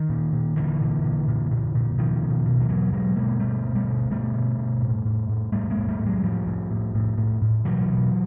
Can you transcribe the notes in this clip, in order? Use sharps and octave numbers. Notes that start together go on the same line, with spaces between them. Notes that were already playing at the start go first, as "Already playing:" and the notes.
Already playing: D#3
A#2
A#2
A#2 D3 E3
A#2
A#2
A#2
A#2
A#2
B2 D#3 F3
B2
B2
F3
B2 E3 F#3
B2 F#3 G#3
B2 G#3 A#3
B2 G3 A3
B2
G3 A3
B2
B2 G3 A3
B2
B2
A2
A2
A2
A2 G3 A3
G#3 A#3
A2
G3 A3
A2
F#3 G#3
A2 F3 G3
A2
A2
A2
A2
A2
B2 E3 F#3
B2